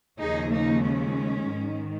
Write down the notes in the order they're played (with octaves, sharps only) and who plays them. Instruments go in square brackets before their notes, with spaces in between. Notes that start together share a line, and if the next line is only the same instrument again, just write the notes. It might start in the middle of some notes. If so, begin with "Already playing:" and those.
[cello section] D#2 C#3 F3 D#4 G#4
A#3 D#4
G#3 C#4
G#2 D#3